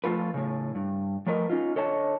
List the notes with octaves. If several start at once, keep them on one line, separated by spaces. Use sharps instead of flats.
F3 A3 F4 B4
A2 C#3
G2
F3 A3 A#4 B4 D#5
C#4 D#4 F4
D3 A4 C#5 D#5 A5